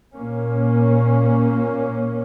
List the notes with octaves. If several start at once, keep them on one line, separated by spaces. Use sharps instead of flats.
A#2 A#3 C#4